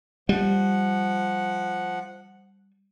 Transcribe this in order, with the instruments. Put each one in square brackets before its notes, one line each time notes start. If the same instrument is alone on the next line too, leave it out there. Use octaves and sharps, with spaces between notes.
[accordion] F3 F#5 [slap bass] G3